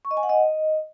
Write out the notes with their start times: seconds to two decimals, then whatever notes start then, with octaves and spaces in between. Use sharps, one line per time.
0.05 C#6
0.11 D#5
0.17 G#5
0.23 F#5
0.29 D#5